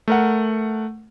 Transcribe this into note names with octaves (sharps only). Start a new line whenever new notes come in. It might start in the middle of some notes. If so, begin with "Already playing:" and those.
A3 A#4 F#5